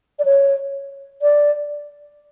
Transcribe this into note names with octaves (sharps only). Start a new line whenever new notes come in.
D5
C#5
D5